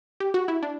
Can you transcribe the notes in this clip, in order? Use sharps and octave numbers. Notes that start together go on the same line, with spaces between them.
G4
F#4
E4
D4